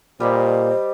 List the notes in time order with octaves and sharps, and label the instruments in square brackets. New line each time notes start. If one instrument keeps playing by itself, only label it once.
[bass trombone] A#2 [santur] G3 G4 D#5 [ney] C5